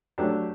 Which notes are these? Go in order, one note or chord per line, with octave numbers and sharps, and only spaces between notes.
F#3 A3 D4 G4